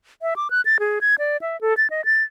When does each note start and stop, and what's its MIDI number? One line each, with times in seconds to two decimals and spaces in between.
0.22 0.34 76
0.36 0.48 86
0.51 0.61 90
0.65 0.78 93
0.80 0.99 68
1.01 1.15 92
1.19 1.37 74
1.41 1.60 76
1.61 1.76 69
1.77 1.88 93
1.90 2.05 75
2.05 2.23 93